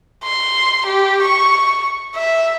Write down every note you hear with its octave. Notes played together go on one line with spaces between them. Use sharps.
C6
G4
C#6
E5